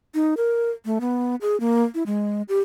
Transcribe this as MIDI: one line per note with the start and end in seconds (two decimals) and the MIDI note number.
0.15 0.34 63
0.37 0.71 70
0.85 0.99 57
1.01 1.35 59
1.41 1.59 68
1.60 1.83 58
1.94 2.03 64
2.06 2.42 56
2.49 2.59 67